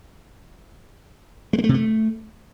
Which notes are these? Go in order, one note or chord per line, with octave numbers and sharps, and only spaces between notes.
G#3
A#3
A3
C3
A3